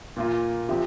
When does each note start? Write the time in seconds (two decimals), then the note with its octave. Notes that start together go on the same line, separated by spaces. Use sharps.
0.16 A#2 A#3 F4
0.69 C3 F3 C4 G4